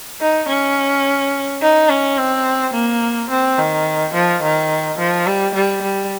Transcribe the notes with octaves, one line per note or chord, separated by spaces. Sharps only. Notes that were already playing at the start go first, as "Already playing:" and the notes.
D#4
C#4
D#4
C#4
C4
A#3
C4
D#3
F3
D#3
F3
G3
G3
G3